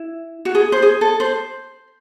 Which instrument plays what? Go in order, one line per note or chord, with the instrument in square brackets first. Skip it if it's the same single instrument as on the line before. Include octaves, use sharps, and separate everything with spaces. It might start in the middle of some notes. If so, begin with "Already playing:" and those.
Already playing: [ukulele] E4
F#4
G#4
C5
G#4
A4
C5